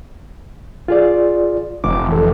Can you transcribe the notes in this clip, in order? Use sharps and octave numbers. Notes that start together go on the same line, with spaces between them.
F4 G#4 D5
F1 D6
E3 A4